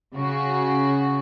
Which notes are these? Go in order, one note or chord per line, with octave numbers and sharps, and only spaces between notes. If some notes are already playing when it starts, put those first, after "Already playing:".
C#3 F#4